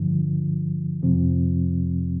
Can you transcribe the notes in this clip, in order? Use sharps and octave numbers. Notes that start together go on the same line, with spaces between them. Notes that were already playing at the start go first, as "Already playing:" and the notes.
Already playing: G2 D3 F3
F2 C3 F3 C4